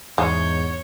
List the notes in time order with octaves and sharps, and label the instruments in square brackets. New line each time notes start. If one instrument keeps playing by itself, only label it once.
[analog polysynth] E2 G#2 G6 [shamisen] G#3 [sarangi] C#5